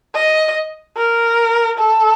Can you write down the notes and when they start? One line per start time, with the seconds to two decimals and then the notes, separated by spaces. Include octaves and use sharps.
0.15 D#5
0.97 A#4
1.78 A4